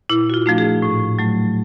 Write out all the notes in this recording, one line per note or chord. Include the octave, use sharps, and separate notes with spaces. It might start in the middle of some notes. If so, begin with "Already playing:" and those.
A#2 E4
F#4
F4
F3 A3 D4
G#4
A2
F#3 A3